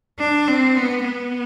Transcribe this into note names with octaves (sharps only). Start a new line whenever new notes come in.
D4
C4
B3
B3